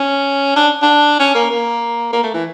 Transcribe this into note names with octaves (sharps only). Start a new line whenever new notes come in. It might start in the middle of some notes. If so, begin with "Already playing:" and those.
Already playing: C#4
D4
D4
C#4
A#3
A#3
A#3
A3
E3